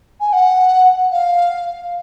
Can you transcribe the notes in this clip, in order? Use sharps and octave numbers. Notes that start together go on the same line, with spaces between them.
G#5
F#5
F5